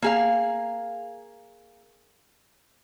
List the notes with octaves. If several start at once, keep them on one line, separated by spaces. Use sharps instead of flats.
A#3 G#4 F5